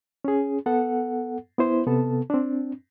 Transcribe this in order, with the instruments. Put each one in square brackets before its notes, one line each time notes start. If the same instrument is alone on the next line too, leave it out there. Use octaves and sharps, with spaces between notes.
[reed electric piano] C#4 G#4
B3 A4 F#5
B3 E4 C5
C3 B3 A4 A5
C4 D4